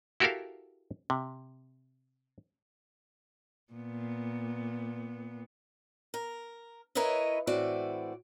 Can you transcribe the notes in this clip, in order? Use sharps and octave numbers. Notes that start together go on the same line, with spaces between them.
E4 F#4 G4 A4 A#4 F5
C3
A#2 B3
A#4
E4 A#4 B4 C#5 D#5 E5
A2 E3 C4 F#4 D5